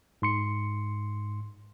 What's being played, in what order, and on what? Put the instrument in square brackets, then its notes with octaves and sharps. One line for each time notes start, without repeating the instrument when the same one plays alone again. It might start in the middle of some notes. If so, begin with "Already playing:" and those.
[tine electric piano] G#2 C6 C#7